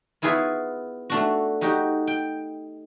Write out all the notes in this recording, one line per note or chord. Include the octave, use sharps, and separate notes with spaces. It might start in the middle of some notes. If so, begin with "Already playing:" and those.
B3 E4 F4 G#4 B4 C#5
A3 D4 F#4
D#4 F#4 G4
G5